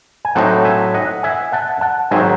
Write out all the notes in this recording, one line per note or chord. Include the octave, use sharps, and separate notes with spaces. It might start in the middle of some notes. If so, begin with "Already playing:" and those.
G#5
A2 F#3 C4 D#4 F#5 A5
E5 G#5
D#5 F#5
E5 G#5
F#5 A5
F#5 A5
G#2 D#3 F#3 C4 E5 G#5